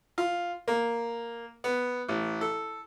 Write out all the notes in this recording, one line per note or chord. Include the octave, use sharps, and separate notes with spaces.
F4
A#3
B3
A1
A4